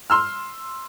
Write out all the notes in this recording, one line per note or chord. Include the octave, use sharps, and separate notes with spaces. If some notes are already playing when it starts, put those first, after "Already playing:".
C6 E6 F6